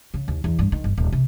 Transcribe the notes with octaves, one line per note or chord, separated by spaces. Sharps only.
C#3
D#2
E2
G2
D#3
G1
D#1
C3